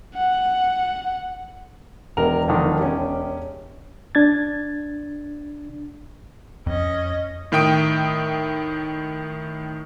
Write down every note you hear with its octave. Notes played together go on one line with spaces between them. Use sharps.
F#5
E1 A#4 F7
F2 D3 D#3
C#4 G4
D4 G#6 A6
F2 C#4 D#5
A2 D#3 E5 G5 D#6 D7